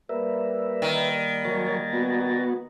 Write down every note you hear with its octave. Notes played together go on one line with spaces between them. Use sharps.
G3 A#3 A#4 B4 E5
D#3
F#3 A#4 C#5 G#5 A#5 A6
B3 F#4